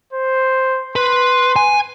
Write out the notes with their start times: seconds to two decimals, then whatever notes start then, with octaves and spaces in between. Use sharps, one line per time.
0.13 C5
0.96 B4 C6
1.56 G#5